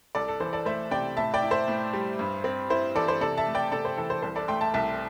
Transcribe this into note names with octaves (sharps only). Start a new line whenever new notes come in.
C2 A4 D5
A4
E3 C5
A4 D5
A3 C5 E5
C3 D5 G5
A2 E5 A5
D5 G5
E4
C5 E5
A2
G3
G2
C4
E4 C5
E3 A4 D5
C5
C3 A4 D5
E5 A5
A3
D5 G5
C3 A4 D5
C5
E3 A4
C5
C2 C5
A4 D5
A3 G5 C6
E5 A5
C2 E5 A5